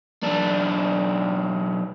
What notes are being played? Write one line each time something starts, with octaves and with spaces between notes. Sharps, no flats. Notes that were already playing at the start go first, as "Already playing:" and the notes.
B1 D4